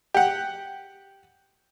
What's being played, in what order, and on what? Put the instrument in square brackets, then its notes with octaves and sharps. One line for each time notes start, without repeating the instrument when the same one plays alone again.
[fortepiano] G4 F#5